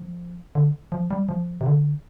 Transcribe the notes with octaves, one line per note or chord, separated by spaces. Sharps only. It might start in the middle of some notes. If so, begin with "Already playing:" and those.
Already playing: F3
D3
F3
G3
F3
C3
D3